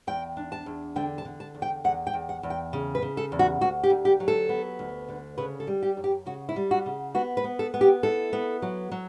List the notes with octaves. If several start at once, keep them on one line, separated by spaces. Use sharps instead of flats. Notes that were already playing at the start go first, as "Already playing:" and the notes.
E2 G5
D4
A5
E2
D3 G5
A5
D3
A5
E2
G5
E2 F#5
G5
E2
F#5
E2
G5
C#3
B4
C#3
A4
E2
F#4
D2 F#4
G4
D2
G4
F#3
A4
B3
D2
D3
C#3 B4
A4
G3
G4
F#2
G4
C#3 F#4
E4
G3
F#4
C#3
B3 F#4
B4
B3
A4
B3
G4
E4 A4
B3
F#3
F#3